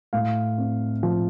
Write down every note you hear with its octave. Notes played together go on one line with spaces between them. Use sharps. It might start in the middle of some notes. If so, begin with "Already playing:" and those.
A2 F5
C4
F3